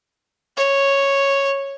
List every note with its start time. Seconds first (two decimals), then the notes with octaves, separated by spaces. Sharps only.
0.57 C#5